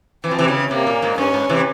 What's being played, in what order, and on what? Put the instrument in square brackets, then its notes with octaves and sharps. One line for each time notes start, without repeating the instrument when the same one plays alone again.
[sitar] E3 [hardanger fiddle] C4
[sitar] F3
C3 E3
C#3
[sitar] C3 [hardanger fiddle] A#3
[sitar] A#2
G#2
[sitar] G2 [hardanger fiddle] C#4
[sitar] G#2
C3 E3